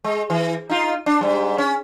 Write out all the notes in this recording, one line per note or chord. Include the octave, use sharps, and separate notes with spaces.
G#3
E3
D#4 F4
D4
G#2 G3
C#4